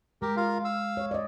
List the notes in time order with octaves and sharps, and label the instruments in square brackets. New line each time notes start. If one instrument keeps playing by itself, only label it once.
[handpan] G#3 [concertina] G4 A#4
[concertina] F4 A#4 F5
F5 E6
[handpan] C#5
D5 D#5